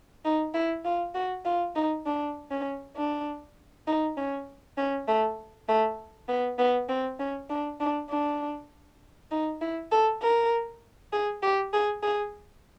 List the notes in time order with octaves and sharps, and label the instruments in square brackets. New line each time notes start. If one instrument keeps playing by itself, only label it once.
[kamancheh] D#4
E4
F4
F#4
F4
D#4
D4
C#4
D4
D#4
C#4
C#4
A3
A3
B3
B3
C4
C#4
D4
D4
D4
D#4
E4
A4
A#4
G#4
G4
G#4
G#4